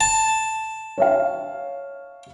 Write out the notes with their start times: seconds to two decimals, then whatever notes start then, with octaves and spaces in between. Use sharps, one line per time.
0.01 A5
0.98 C#5 E5 F5